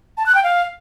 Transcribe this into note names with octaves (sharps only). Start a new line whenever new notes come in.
A5
F#6
G5
F5